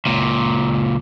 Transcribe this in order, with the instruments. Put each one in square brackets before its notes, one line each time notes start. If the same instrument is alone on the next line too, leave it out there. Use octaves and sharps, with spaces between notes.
[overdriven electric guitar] C#2 A#2